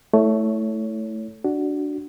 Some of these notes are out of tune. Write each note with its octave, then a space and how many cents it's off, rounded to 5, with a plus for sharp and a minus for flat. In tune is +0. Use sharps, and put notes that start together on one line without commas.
A3 +0 E4 -15 C#5 +15
D4 +0 F#4 +10